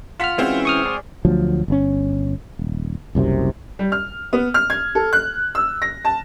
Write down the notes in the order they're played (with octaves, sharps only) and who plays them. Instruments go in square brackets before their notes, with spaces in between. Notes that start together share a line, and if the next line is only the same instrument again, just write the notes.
[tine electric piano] F4 F6 [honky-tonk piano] F#5 B6
[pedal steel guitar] E3 C#4 E5 [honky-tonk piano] G#3 C4 F#4
[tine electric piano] C#6 D#6 F6
[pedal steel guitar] D5 G#5 C6
[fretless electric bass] D2 F3 F#3
G1 D3 C#4
D#1
F#1 C2 F#2 C3
[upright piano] G3
F6
B3
F6
G#6
A4
F#6
E6
A#6
A5